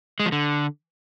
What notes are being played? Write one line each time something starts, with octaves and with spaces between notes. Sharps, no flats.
G#3
F3
D3